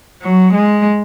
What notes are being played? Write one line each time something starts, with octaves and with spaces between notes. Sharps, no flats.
F#3
G#3